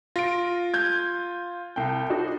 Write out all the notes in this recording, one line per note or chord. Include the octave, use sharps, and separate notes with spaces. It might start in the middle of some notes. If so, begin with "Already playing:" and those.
F4 A#6 D7
G6 G#6
C2 G5
D4 D#4 F#4